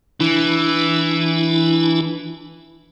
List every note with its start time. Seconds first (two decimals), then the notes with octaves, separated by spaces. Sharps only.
0.20 E3 D4 E4